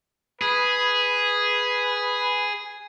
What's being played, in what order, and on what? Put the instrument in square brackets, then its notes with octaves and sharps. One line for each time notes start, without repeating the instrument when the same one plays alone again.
[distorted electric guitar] G#4 [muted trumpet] B4